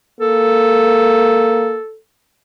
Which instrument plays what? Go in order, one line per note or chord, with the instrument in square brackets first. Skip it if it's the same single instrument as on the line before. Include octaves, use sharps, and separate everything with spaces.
[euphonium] A#3 [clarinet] A4